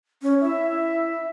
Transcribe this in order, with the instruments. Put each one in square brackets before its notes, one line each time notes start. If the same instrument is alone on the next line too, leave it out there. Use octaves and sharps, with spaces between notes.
[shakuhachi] C#4
[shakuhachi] E4 [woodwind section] E5